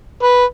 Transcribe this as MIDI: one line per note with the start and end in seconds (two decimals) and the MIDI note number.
0.23 0.44 71